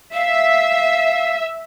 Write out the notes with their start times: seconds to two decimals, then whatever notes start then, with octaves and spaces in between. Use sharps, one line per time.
0.14 E5 F5